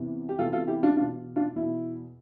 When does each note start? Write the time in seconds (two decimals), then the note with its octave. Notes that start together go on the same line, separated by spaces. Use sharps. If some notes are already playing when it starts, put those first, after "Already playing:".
Already playing: E2 C3 E3
0.29 G4
0.38 E2 C3 E3 F4 A4
0.52 F4 A4
0.67 E4 G4
0.83 D4 F4
0.97 E2 B2 D4 F4
1.36 D4 F4
1.56 E2 B2 E4